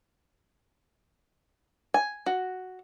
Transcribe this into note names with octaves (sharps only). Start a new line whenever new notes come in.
G#5
F#4